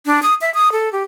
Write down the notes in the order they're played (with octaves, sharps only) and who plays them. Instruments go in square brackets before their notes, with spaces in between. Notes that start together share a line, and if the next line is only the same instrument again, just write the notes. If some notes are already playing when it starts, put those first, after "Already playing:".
[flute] D4
D#6
E5
D#6
A4
G4